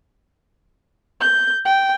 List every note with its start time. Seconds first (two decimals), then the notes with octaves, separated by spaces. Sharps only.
1.21 G6
1.65 G5